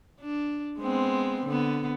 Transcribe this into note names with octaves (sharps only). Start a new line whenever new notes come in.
D4
G#3 B3 C4
D3 B3